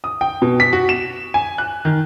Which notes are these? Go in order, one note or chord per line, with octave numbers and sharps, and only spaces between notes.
D#6
G5
B2
B6
F#4
E7
G#5
F#6
D#3